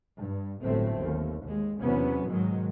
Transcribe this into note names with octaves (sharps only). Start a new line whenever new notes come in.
G2
G1 A2 F#3 A3 C4
D#2
D#2 G#3
E2 C3 F#3 B3 C#4
G#2 B2 D#3 F#3 G#3